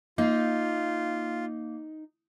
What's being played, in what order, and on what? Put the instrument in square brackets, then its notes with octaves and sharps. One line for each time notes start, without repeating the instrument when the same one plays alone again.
[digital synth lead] A#3 [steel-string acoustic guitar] D#4 [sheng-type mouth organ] F4